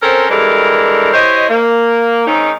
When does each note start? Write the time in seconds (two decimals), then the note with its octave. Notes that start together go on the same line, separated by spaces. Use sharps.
0.03 C4 C#4 A4 A#4 C5
0.30 G2 E3 G3 G#3 A4 A#4
1.13 E4 G4 C5 C#5 D#5
1.50 A#3
2.27 G#2 D#3 C4 C#4 D#4